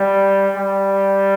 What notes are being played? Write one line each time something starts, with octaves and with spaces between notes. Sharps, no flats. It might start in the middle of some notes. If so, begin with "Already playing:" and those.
Already playing: G3
G3